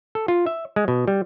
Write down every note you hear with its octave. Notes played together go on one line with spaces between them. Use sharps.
A4
F4
E5
G#3
B2
G3